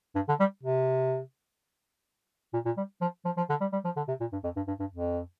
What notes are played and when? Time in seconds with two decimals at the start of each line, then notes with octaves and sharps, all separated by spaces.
0.15 G2
0.28 D3
0.39 G3
0.63 C3
2.53 A#2
2.65 A#2
2.77 G3
3.01 F3
3.25 F3
3.37 F3
3.49 D3
3.61 G3
3.73 G3
3.85 F3
3.96 D3
4.08 C3
4.20 A#2
4.32 G2
4.44 F2
4.56 G2
4.67 G2
4.80 G2
4.91 F2